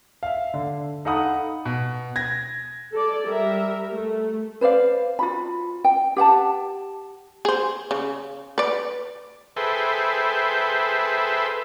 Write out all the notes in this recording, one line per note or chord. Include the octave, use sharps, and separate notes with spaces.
E5 F5
D3
D#4 A4 F5 F#5 B5 D#6
B2
G#6 A#6
A4 D5
G3 A#4 E5
A3
B4 C5 D5 F5
F4 F#4 B5
G5
G4 F#5 G5 A5
G#4 C5
C#3
B4 D5
G#4 A4 B4 C5 E5 G5